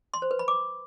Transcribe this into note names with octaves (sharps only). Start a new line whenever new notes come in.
C6
C5
B4
B5
D6